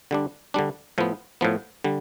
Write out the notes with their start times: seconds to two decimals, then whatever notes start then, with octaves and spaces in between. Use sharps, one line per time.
0.11 D3 G3 D4
0.54 D3 G3 D4
0.98 A2 F3 B3
1.41 A2 F3 B3
1.84 D3 G3